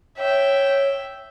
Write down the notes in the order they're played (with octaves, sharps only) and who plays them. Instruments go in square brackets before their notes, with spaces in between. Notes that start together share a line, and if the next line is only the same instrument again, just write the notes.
[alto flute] C#5 [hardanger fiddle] E5 G5